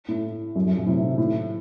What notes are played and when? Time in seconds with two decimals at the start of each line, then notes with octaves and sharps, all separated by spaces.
0.09 A2
0.56 F#2
0.66 F#2
0.77 F#2 A#2
0.86 A2 C3
1.02 C3 D#3
1.18 A2